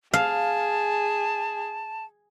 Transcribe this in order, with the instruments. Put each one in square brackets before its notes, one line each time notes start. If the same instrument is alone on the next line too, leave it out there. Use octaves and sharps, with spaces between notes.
[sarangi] G#4 [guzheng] F5 [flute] A5